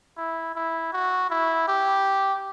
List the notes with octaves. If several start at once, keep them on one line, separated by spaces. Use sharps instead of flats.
E4
E4
F#4
E4
G4